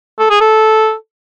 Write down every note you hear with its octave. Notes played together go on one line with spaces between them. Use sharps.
A4
G#4
A4